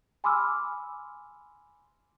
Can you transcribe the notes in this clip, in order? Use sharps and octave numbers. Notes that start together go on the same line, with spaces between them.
G#5 B5 C6 D6 E6 F6